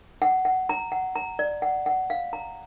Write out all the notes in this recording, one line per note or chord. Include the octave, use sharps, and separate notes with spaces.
F#5
F#5
A#5
F#5
A#5
D5
F#5
F#5
F5
A#5